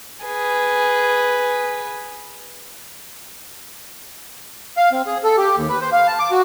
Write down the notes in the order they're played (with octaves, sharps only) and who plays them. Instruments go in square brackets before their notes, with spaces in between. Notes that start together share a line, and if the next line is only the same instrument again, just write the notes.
[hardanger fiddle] G#4 B4
[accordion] F5
C4
G#4
A4
G4
D#2
B4
C5
F5
A5
D6
F#4